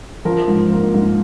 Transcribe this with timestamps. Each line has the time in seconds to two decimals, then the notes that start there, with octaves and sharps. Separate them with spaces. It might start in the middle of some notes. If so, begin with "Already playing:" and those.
0.25 F3 A#4
0.48 G#2
0.70 A#3
0.94 G#2